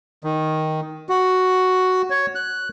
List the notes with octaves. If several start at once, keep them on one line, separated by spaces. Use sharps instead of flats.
D#3
F#4
C#5
F#6